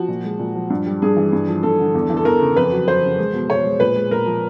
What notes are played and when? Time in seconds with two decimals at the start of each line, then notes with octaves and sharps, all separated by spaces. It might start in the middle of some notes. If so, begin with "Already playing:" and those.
Already playing: F3 F#4
0.08 A#2
0.24 G#3
0.39 A#2
0.55 F3
0.70 G2
0.86 G3
1.02 G2 G#4
1.17 E3
1.33 G2
1.48 F3
1.63 G2 A4
1.79 D3
1.94 E2
2.10 E3
2.17 A4
2.25 E2 A#4
2.40 C#3
2.56 F2 B4
2.72 F#3
2.87 F2 C5
3.03 C#3
3.18 G#3
3.33 B2
3.49 B2 C#5
3.65 G#3
3.80 A#2 B4
3.96 G#3
4.11 A#2 A#4
4.26 F3